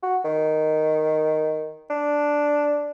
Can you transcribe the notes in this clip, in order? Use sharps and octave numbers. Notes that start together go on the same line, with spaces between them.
F#4
D#3
D4